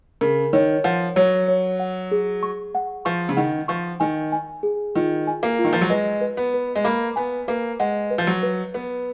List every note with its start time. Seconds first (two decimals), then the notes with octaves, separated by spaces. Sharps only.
0.21 C#3 A#4
0.53 D#3 C#5
0.84 F3 F#5
1.16 F#3 C#5
1.48 C#5
1.79 F#5
2.11 G#4
2.43 C#6
2.75 F#5
3.05 F3 C#6
3.29 C#3
3.37 D#3 F#5
3.68 F3 C#6
4.00 D#3 G#5
4.32 G#5
4.63 G#4
4.95 D#3 F4
5.27 G#5
5.43 A#3
5.59 F4
5.64 D#3
5.73 F3
5.81 F#3
5.90 G#3 B4
6.21 B4
6.37 B3
6.54 B4
6.75 G#3
6.84 A#3 B5
7.16 B3 G#5
7.48 A#3 B4
7.80 G#3 F#5
8.11 B4
8.18 F3
8.27 F#3
8.43 B4
8.74 B3 B4